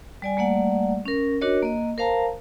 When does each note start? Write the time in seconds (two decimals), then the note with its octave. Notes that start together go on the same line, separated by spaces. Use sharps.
0.22 G3 D5 G#5
0.37 G3 A3 A#3 D5 F#5
1.06 C#4 A#4
1.41 D4 F#4 A#4 C#5 D#5
1.62 A#3 D#5
1.98 A#4 C5 F5 A5 A#5